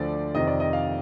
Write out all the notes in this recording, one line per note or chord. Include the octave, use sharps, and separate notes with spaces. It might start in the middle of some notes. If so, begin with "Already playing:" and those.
Already playing: D2 D3 F3 D5
F2 C3 D#3 D#5
D5
D#5
F5